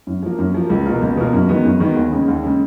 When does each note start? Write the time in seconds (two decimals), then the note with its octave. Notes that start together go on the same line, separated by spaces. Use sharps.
0.07 F#2
0.23 F3 A#3
0.39 F#2
0.54 F3 A#3
0.70 C#2
0.86 B2 A#3 F4 A#4
1.02 C#2
1.17 B2 A#3 F4 A#4
1.33 F#2
1.49 D#3 G#3 B3
1.65 F#2
1.80 D#3 G#3 B3
1.96 D#2
2.12 C#3 G#3
2.28 D#2
2.43 C#3 G#3